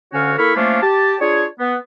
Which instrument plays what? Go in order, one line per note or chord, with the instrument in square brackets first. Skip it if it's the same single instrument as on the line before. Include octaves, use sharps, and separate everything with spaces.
[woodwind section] D2 D3 C#4 F#4 C#5 F5
A#3 E4 A4 B5 C#6 F6
F3 A3 A#3 C#4 D4 F4
G4 A5
D4 F4 G#4 C#5
B3